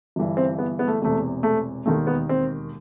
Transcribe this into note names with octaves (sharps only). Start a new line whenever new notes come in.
G1 G2 E3
C4
B3
B3
A3
E1 E2 C3 A3
A3
E1 D#2 D#3 A3
B3
C4